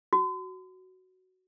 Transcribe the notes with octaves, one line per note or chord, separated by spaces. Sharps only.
F#4